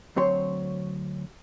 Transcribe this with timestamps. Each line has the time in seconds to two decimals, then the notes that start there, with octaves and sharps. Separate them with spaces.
0.16 D2 F#3 C4 C#5 C6